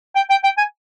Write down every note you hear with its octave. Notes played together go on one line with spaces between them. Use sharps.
G5
G5
G5
G#5